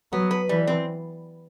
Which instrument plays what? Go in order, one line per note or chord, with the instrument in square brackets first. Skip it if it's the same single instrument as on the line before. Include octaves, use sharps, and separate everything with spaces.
[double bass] F#3 [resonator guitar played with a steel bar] B3
[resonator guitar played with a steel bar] B4
[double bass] E3 [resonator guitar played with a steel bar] G3
[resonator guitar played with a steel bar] C4